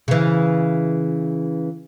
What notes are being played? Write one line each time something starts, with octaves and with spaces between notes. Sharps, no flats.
C#3 E3